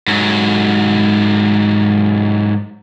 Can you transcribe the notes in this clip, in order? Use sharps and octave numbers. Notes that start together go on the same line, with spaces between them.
G#2 F#3